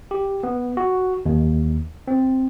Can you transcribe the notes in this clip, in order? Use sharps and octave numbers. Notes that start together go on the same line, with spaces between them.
G4
B3
F#4
D#2
C4